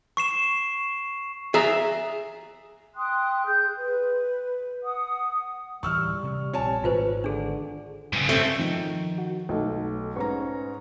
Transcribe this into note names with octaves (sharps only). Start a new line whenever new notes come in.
C#6 C7 E7
G#4 E5 A#5
G5 C6 D#6 F#6
G#4 G6
B4
F#5 D#6
D1 E3 G3 C#6 E6 F6
C3
A#1 C4 C#5 G#5 A5
G#1 G#2 D#3 F4 B4 C5
D3 D4 G#4
G2 C#3
A3 C4
D#3 F3
F#4
B1 A3 D#4 A4
G#2 C#4 B4 A#5 C#6